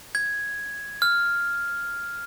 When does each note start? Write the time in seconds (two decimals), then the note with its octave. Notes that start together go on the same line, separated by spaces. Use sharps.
0.15 G#6
1.02 F6